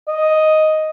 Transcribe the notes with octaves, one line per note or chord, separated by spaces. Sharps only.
D#5